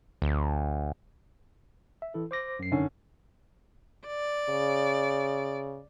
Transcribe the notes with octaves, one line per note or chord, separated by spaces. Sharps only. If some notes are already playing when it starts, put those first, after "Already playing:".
D2
E5
E3 E4 A4
C5 D6 A#6
F#2 C7
D3 D#3 C#4
D5
C#3